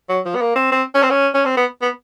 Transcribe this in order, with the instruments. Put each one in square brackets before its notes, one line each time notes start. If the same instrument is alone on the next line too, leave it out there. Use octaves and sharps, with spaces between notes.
[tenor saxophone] F#3
F3
B3
A#3
C4
C4
C#4
C4
C#4
C#4
C4
B3
B3